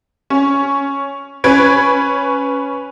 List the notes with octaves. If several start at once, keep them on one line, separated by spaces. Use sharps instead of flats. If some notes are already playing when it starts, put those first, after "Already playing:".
C#4
C#4 B4 G#6 D7